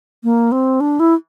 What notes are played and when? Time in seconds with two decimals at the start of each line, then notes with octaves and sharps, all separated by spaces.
0.24 A#3
0.52 C4
0.80 D4
1.00 E4